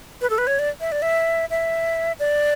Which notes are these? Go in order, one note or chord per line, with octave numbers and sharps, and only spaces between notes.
B4
A4
B4
C#5
D5
E5
D5
E5
E5
D5